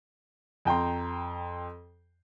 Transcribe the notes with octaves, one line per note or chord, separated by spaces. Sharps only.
F2 G5 A#5 C6